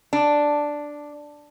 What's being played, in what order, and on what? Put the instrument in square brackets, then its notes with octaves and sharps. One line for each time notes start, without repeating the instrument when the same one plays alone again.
[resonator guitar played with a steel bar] D4